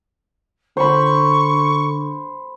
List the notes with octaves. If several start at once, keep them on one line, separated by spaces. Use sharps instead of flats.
D3 C5 B5 C#6